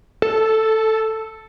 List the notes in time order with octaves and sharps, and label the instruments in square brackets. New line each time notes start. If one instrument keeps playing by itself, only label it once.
[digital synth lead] A4